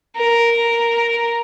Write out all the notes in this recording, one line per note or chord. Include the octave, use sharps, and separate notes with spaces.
A#4